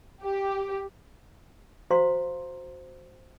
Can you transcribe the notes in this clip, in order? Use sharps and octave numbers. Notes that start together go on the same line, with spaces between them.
G4
F#4 C5 F5 A#5 C6